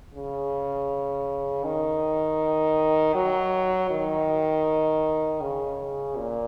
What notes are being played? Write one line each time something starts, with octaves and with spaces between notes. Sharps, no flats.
C#3
D#3
F#3
D#3
C#3
A#2